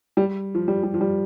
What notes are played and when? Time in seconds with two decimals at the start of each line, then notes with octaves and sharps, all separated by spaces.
0.17 G3
0.55 F3
0.68 G3
0.83 G3
0.94 F3
1.01 G3